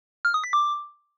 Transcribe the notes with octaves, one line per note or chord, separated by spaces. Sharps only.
F6
D#6
B6
D6